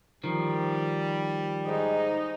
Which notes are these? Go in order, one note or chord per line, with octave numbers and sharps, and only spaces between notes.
D#3 F3 G3
G#2 D#4